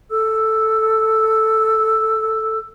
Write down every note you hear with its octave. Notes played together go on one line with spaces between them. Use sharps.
A4 E6